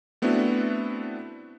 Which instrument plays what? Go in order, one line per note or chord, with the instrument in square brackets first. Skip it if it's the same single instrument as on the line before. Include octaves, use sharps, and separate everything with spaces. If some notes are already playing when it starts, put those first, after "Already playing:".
[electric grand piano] A3 B3 C4 D4 E4 F#4